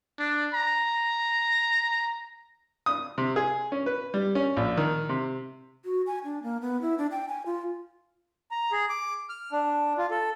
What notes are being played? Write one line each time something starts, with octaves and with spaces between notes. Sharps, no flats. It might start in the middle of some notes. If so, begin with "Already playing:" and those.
D4
A#5
D#6
C3
G#4
C#4
B4
G3
C#4
A#1
D#3
C3
F#4
G#5
D4
A#3
B3
E4
D4
G5
G#5
F4
A#5
G#4
D6
F6
D4
F4
A4